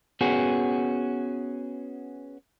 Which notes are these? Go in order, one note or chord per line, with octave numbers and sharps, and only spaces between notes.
B3 C#4 F#4 G#4